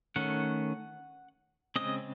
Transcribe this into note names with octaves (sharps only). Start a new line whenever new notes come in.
D#3 A3 C#4 F#5
C#3 G#3 C4 D#5